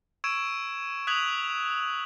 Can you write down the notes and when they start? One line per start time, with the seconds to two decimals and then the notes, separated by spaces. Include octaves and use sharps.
0.24 C#6 E6 G#6 D7 E7
1.07 D#6 F#6 G#6 B6 F7 F#7